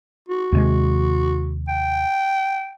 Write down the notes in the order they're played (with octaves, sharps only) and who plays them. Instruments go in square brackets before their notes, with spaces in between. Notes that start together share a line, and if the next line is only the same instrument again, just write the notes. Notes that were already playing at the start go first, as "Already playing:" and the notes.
[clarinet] F#4
[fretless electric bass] D#2 C3 G#3
[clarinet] G5